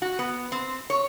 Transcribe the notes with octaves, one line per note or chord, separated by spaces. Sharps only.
F#4
B3
C4
C#5